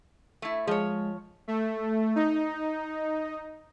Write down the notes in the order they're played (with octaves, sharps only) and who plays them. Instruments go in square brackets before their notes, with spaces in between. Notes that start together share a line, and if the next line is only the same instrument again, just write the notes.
[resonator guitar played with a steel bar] A3 E4
[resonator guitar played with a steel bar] F3 C#5 [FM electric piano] G#3
[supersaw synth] A3
D#4